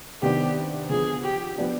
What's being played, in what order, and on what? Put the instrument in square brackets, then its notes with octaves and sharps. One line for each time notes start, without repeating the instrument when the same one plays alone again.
[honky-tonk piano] C3 D#3 B3 D4 [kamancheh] G4
[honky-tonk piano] D3 F3 B3 [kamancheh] G#4
[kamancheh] G4
[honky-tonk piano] F3 B3 D4 G4